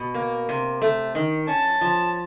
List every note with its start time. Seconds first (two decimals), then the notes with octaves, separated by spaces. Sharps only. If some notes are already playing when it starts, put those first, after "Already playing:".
Already playing: B2
0.14 A#3
0.49 C3
0.82 A3
1.15 D#3
1.47 C#4 A5
1.81 F3